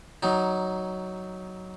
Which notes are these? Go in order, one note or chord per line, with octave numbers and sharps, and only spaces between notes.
F#3 D#4